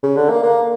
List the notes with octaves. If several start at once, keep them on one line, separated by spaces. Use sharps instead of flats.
C#3
D3
A#3
A#3